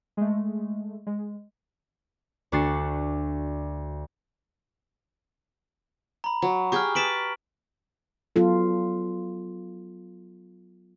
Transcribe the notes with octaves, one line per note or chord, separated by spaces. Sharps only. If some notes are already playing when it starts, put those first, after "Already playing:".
G#3 A3
G#3
D2 D4 F#4 A6 C7
A#5 B5
F#3 A#5
G4 G#4 G5 C#6 F6
B4 A5 B6 D7 F#7
F#3 B3 F4 A4